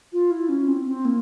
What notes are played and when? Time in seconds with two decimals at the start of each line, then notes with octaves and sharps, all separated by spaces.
0.13 F4
0.31 E4
0.49 C#4
0.68 C4
0.86 C4
1.05 A#3